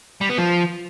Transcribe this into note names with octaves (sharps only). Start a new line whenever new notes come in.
G3
B3
F3